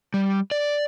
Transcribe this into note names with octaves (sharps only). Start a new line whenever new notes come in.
G3
D5